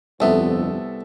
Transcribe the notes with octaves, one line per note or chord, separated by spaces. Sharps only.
G1 C2 F2 B3 A4 E5